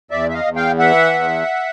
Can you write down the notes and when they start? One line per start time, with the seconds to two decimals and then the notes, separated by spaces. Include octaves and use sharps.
0.11 E2 D5 E5
0.29 E5
0.33 D#5 F5
0.44 E2
0.56 F5 G5
0.79 E3 E5 F#5
1.13 E2